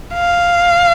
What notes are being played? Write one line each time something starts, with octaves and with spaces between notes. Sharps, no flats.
F5